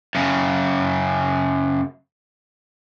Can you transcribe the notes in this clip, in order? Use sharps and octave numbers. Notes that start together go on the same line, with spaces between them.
F#2 C#3